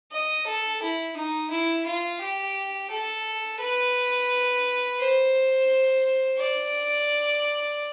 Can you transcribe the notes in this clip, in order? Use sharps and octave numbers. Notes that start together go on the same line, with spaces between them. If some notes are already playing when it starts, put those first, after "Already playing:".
D#5
A4
E4
D#4
E4
F4
G4
A4
B4
C5
D5